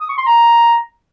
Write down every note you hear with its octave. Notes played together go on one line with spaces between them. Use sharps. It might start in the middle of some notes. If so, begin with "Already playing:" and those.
D#6
C#6
C6
A#5